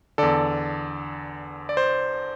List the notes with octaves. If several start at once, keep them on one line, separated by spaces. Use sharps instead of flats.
E2 D3 A4 D5
D5
C5